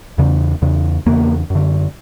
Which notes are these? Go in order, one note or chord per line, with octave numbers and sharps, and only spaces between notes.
E2 C#3
E2 C#3
E2 C#3 A#3
F#2 D3